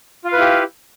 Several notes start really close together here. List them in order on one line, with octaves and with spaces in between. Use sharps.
F4 F5 B4 E4 G4